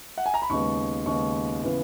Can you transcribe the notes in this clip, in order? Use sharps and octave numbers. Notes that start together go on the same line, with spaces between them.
F#5
G#5
A#5
B5
D#2 C#3 G#3 B3 C#6
D#2 C#3 G#3 B3 C#6
C#3 E3 B3